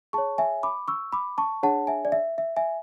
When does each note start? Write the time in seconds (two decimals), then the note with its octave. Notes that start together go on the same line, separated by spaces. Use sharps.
0.13 G#4 C#5 A5 C#6
0.38 E5 G#5
0.63 B5 D6
0.88 C#6 E6
1.12 B5 D6
1.38 A5 C#6
1.63 D4 G#4 C#5 F#5 A5
1.87 E5 G#5
2.05 D5
2.12 E5
2.38 E5
2.56 E5 G#5